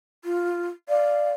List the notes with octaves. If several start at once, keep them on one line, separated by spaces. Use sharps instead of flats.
F4
D5 F5